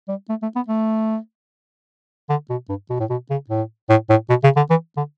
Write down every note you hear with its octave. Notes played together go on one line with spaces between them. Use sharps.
G3
A3
A3
B3
A3
D3
B2
G2
B2
A2
B2
C#3
A2
A2
A2
B2
C#3
D3
E3
D3